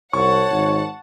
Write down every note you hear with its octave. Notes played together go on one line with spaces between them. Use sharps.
C2 C#5 F#5 A5 C#6
G#1